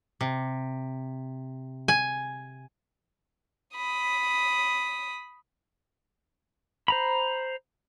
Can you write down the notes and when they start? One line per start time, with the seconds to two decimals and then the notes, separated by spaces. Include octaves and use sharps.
0.21 C3
1.88 G#5
3.76 B5 D#6
6.88 C5 A#5 B5